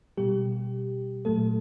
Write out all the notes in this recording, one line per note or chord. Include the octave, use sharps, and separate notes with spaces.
B2 G3 G4
A#2 F#3 A3 A4